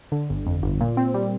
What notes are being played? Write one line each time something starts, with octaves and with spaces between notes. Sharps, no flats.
D3
G1
F2
G1
A#2
C4
G3